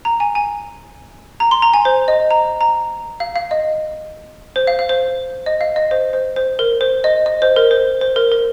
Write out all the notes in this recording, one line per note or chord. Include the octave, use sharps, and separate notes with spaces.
A#5
G#5
G#5
A#5
C6
A#5
G#5
C5
D#5
A#5
A#5
F5
F5
D#5
C5
F5
F5
C5
D#5
F5
D#5
C5
C5
C5
A#4
C5
D#5
D#5
C5
A#4
C5
C5
A#4
A#4